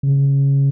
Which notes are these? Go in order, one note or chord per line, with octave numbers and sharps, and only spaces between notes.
C#3